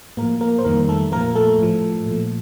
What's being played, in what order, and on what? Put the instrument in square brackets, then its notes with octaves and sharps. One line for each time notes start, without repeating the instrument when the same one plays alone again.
[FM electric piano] A2 F3 A#3 A#4
A#3 A#4
C5
F2 D#3 G3 A#3 A#4
A3 A4
A#2 F3 A#3 A#4
A3 A4
A2 F3
A#2 F3